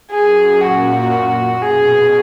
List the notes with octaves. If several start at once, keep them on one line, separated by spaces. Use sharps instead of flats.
F#2 G#4
A#2 F#4
B2 G#4